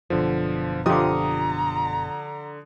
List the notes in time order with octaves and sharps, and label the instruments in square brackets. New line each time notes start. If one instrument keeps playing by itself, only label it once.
[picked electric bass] F#1 B2 [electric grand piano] D3 F3
[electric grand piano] D3 D#6 [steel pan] F3 F4 G4 [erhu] A#5